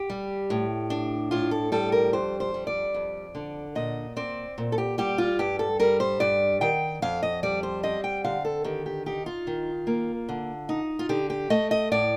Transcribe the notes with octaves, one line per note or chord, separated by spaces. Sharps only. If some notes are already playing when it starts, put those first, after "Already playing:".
Already playing: G4
G3
A2
D4
A2 F4
A4
G3 A4
A#4
F2 C5
C5
G3
D5
F2
D3
A#2 D#5
C4 D5
A#2
A4
G4
G3 G4
F4
G2 G4
A4
G3 A#4
C5
G2 D5
D#3 G5
F2 F5
D#5
G3 D5
C5
C4 D#5
G5
D3 F5
A4
D#3 G4
G4
D#4 G4
F4
D#3
A#3
D3
D#4
F4
D3 G4
G4
A3 D#5
D#5
A2 D5